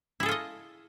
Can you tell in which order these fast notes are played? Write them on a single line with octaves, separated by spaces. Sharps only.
E4 G#4 A4 F4 D#5